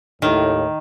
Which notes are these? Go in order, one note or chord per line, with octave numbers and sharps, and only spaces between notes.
D#2 A2 D#3